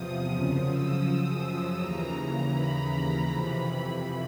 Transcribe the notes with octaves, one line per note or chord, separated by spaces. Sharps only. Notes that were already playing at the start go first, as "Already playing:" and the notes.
Already playing: E2 C3 F3 D#6
F#2 C#3 F3 D#6
E6
D#6
D#2 C#3 E3 A#5
B5
F2 C3 E3